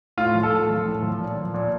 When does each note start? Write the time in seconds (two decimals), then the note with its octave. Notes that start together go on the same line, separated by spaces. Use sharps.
0.17 A2 F4
0.35 F3
0.43 A4
0.51 A2
0.69 F3 A4
0.86 A2
1.03 F3
1.20 A#2
1.36 F3
1.54 A#2